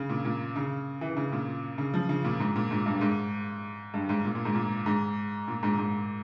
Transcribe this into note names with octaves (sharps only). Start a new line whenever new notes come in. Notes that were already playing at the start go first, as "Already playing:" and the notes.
Already playing: C#3
A#2
A#2
C#3
E3
C#3
A#2
C#3
F3
C#3
A#2
G#2
A#2
G#2
G2
G#2
G2
G#2
A#2
A#2
G#2
A#2
G#2
A#2
G#2
G#2